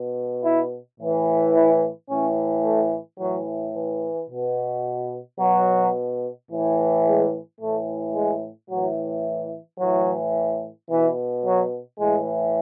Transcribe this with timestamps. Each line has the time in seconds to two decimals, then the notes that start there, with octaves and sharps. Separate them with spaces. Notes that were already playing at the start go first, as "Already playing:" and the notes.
Already playing: B2
0.44 E4
0.99 A2 E3
1.55 E4
2.10 A2 E3 C#4
2.64 A3
3.19 A2 E3 F#3
3.74 E3
4.30 B2
5.39 B2 F#3
6.50 A2 E3
7.05 G#3
7.60 A2 E3 A3
8.15 G#3
8.69 A2 E3 F#3
9.80 A2 E3 F#3
10.90 B2 E3
11.45 F#3
12.00 A2 E3 G#3